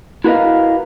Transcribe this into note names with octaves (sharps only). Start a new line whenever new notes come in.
E4 F#4 A#4 B4 D#5 F5